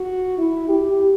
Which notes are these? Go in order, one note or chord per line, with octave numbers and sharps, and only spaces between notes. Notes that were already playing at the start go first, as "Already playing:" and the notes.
Already playing: F#4
E4
G4